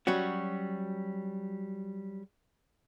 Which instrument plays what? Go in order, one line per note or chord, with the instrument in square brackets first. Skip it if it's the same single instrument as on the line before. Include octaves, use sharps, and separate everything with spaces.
[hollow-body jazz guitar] F#3 G3 C#4 F#4